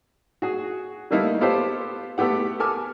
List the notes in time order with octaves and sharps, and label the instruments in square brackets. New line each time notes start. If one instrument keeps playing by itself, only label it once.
[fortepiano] F#4 G#4
G3 A3 A#3 D#4 E4
B3 F4 G4 A4 C5
A3 B3 G4 F#5
A4 A#4 G#5 D6 F6